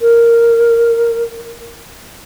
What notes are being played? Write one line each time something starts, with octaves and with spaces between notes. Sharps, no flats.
A#4